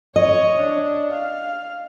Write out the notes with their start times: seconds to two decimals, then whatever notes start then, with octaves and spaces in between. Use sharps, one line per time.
0.16 C#5 D#5
0.58 D4
1.13 F5